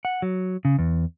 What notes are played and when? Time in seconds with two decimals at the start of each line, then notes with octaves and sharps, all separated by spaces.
0.05 F#5
0.22 F#3
0.65 C#3
0.79 E2